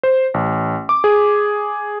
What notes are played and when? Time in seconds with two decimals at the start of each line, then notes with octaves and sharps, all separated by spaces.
0.03 C5
0.34 A1
0.89 D6
1.04 G#4